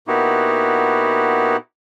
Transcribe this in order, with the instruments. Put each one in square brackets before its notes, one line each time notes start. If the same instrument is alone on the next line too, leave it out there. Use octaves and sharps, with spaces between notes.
[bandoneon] A#2 B3 D#4 E4 F#4 G4